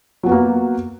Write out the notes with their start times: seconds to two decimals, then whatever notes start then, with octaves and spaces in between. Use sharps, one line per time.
0.23 F#3
0.26 B3
0.29 F#4
0.32 A#3